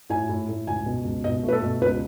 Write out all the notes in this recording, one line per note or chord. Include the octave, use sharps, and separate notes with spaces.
A2 G#5
A2
A2
C#2 G#5
B2
C#2
B2 D#5
A3
B4
A4
B2
C#2 B4